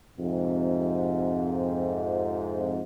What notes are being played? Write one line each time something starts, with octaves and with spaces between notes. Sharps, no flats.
F2 G#2 C3